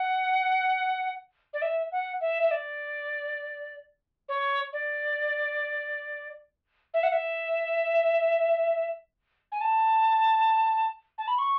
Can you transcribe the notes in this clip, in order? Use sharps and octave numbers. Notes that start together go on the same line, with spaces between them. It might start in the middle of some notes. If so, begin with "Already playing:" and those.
Already playing: F#5
D5
E5
F#5
E5
E5
D5
C#5
D5
E5
F#5
E5
G#5
A5
A5
B5
C#6